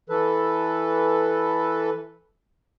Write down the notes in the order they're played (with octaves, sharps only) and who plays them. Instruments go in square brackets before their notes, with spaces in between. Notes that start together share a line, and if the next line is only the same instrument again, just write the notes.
[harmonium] E3 A4 B4